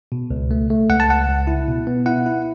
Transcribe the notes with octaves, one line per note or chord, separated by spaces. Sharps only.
B2
C#2
A3
A3
C#2 F#5
A5
C#2 F#5
C#2
E4
B2
B3
E4 F#5
E4